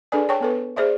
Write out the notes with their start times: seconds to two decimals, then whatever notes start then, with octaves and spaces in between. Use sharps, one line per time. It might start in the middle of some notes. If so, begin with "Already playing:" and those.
0.12 D4 G#4 A4 B4 D5 G#5
0.29 C#5 G5 A5 C#6
0.41 B3 A4 B4
0.76 G#4 C5 D5 E5